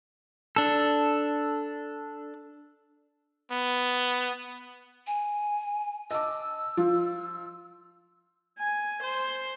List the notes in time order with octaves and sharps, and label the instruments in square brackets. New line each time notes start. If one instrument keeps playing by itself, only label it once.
[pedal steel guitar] D4 A4
[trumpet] B3
[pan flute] G#5
[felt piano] D#5 A5 D6 [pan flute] E6
[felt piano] F3 F4
[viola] G#5
C5